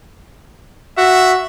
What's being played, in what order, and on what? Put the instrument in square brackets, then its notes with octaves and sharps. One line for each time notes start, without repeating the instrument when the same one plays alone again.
[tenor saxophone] F#4 [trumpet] E5